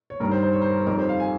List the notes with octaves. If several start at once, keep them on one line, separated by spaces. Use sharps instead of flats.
C#5
G2 D#3 G3 A#4
C5
C5
C#5
C5
A#4
C#5
F2 D#3 G3 A#4
C5
F5
G#5